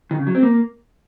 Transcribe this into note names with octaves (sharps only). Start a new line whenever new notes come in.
D#3
C#3
F#3
C4
A#3